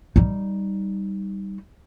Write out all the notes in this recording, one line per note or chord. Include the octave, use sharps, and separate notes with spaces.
G3 D#4